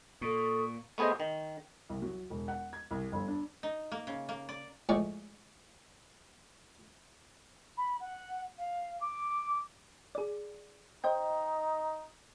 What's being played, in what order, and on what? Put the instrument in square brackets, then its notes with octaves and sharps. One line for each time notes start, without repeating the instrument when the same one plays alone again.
[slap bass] A#2 [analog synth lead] A#3 [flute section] A4 D#6 [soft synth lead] C#6
[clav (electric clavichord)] A3 B3 G#4 C5 D#5
D#3
[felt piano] C2
F#3
E1
F#5
G#6
C2
G1
D4
[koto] D#4
A#3
C#3
A#3
D5
[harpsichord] A2 F3 G#3 D5 C#6
[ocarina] B5
F#5
F5
D6
[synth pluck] G#4 D5
[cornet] D#4 [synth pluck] C5 D#5 G5